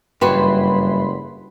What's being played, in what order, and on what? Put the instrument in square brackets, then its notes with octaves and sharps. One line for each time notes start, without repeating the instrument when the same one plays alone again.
[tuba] F#1 [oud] G2 E3 F#4 [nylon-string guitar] G4 B4 [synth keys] B5 C6